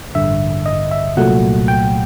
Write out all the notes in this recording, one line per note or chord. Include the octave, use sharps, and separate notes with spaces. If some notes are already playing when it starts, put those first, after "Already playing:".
A1 G2 D3 E5
D#5
E5
C2 A#2 F#3 A3 F#5
G5